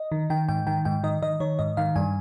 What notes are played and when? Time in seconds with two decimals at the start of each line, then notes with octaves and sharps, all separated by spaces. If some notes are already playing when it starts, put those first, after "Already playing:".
Already playing: D#5
0.12 D#3
0.30 D#3 G5
0.49 G#2 G5
0.67 D#3 G5
0.85 G#2 G5
1.04 D#3 D#5
1.22 D#3 D#5
1.40 D#3 C#5
1.59 G#2 D#5
1.77 D#3 F5
1.96 G2 G#5